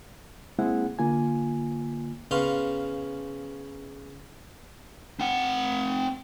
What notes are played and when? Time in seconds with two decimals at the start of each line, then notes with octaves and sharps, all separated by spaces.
0.59 G#3 A#3 C4 E4 G#4 F#5
0.99 D3 A#3 F4 G#5
2.31 C#3 B3 C#4 F5 C6
5.20 C4 F#5